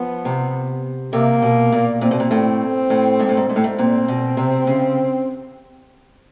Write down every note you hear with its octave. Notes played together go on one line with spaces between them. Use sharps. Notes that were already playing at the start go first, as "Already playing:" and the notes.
Already playing: F3 B3
C3
C3 A#3
B2
A#2
A#2 C4
B2
A#2
A2
A2
G#2
A2
G#2
G#2
A2
G#2
A#2 C4
B2
C3
C#3